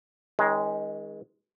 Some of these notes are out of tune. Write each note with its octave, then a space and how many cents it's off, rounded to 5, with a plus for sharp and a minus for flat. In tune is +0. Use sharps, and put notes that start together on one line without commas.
D#3 +40 G#3 +0 C#4 +0